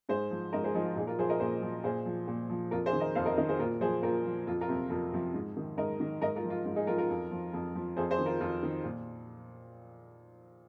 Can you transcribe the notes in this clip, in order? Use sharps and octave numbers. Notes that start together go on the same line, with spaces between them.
G#2 G#4 C5
F3
G#2 A#4 D#5
G#4 C5
F3 D#4 G#4
F4
A#2 D#4 G#4
F4 A#4
F3 G#4 C5
A#4 D#5
A#2 G#4 C5
F3
A#2 G#4 C5
F3
A#2
F3
F2 F4 A#4
G#4 C5
D#3
A#4 D#5
F2 C5 F5
A#4 D#5
D#3 A#4 D#5
G#4 C5
A#2 F4 A#4
F3 G#4 C5
A#2 F4 A#4
F3
F2 F4
F4 A#4
C3 F3
F2 F4 A#4
C3 F3
G#2
D#3
G#2 A#4 D#5
D#3
G#2 A#4 D#5
F4 A#4
F3
F4
G#2 F4
D#4 G#4
F3 F4 A#4
F4 A#4
F2
F3
F2
F3
F2 G#4 C5
G#4 C5
D#3
F4 A#4
F2 F4
D#3
A#2